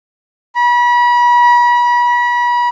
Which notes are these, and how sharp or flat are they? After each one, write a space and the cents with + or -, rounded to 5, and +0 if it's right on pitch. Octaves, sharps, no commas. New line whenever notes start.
B5 -35